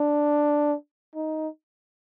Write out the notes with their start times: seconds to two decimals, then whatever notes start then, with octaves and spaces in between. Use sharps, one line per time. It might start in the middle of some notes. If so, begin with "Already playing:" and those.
Already playing: D4
1.15 D#4